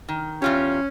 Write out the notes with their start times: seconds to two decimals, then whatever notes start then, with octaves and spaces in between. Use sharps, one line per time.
0.09 D#3
0.42 E2 C#4 F4 G4